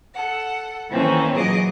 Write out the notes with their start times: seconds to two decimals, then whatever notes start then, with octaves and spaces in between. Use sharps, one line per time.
0.14 A4 F#5
0.90 D#3 E3 A#3 C4 C#4 A4
1.36 A#2 E3 F#3 G#4 D#5 D6